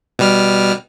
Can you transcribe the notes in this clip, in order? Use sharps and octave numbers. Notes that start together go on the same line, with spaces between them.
B2 G3 F6